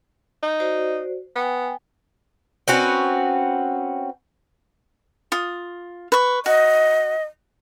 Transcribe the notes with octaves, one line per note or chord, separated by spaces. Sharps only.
D#4
F#4 C5 D5
B3 G5 G#5
C4 C#4 F#4 B4
F4 D#6
B4 C#6
F#4 D#5